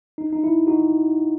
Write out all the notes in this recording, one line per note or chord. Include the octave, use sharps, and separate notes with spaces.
D#4
D#4
E4
D#4 F#4